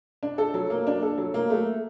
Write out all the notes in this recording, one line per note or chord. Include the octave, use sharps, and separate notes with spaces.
D4
A4
F#3
A#3
D4
A4
F#3
A#3
A3